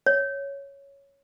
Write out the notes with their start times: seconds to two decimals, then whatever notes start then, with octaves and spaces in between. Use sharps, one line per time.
0.06 C#5